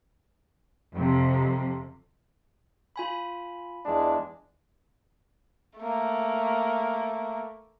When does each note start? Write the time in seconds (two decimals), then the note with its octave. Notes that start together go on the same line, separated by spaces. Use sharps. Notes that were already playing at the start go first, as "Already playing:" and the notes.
0.94 F2 C3
2.96 F4 G#5 B5
3.86 E2 G#3 D4
5.78 A3 A#3